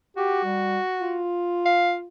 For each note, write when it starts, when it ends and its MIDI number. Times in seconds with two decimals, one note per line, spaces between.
0.17 1.24 66
0.17 0.44 67
0.45 0.78 55
1.01 2.07 65
1.65 1.94 77